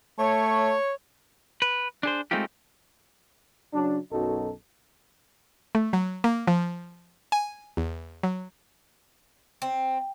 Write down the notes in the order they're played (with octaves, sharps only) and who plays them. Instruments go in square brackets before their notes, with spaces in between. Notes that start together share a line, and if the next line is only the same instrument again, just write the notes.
[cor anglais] A3 [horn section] C#5
[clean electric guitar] B4
D4 G#4 C5
G#3 A3 C4 D#4 F4 G4
[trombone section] C#3 F#3 D4
B1 F#2 D#4 F#4 A4
[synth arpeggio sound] A3
F#3
A#3
F3
G#5
E2
F#3
[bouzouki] C4